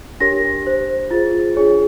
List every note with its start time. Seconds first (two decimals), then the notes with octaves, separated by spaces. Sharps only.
0.20 D4 G4 A#4 C#5 A#6
0.66 G4 C5
1.11 F4 G#4 C5 A6
1.56 D4 F4 G#4 C#5